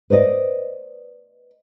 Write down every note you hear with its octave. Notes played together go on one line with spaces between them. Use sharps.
B4 C5 D5 D#5